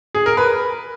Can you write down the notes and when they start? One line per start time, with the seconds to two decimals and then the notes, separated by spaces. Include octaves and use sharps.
0.15 G#4
0.26 A#4
0.37 B4